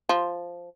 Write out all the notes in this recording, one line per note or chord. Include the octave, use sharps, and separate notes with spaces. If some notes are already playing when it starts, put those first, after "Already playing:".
F3